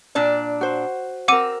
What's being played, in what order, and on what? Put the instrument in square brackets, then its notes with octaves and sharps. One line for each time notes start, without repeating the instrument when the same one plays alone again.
[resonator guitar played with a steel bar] A#2 D4 D5
[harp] F#4 C5
[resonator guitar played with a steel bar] C4 [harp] A#4 E6 [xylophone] F#5 D6 D#7